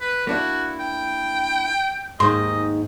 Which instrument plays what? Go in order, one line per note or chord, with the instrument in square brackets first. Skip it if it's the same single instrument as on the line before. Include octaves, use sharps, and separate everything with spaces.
[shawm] B4
[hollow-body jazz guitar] A#3 D4 E4 [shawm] F#4
[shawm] G5
[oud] D#2 G#2 [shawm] D#5 [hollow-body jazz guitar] C6